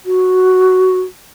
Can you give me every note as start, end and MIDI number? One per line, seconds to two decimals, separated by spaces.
0.06 0.99 66